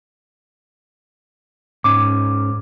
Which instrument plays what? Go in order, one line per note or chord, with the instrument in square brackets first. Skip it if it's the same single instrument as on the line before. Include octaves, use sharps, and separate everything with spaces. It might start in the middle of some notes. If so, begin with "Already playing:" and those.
[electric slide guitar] G#2 C#4 [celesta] D6